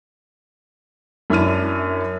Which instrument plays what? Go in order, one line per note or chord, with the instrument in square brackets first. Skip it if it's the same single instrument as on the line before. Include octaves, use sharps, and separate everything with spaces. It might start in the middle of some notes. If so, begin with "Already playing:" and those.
[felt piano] F#2 D4 E4 F6 D#7